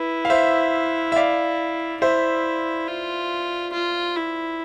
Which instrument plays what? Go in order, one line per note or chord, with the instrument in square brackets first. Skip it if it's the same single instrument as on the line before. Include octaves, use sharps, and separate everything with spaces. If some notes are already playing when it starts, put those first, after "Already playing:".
Already playing: [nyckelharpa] E4 [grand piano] B4
[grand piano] F5
C5 E5
E5
D5 F5
[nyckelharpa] E4 [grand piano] C5 E5
[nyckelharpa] F4
F4
E4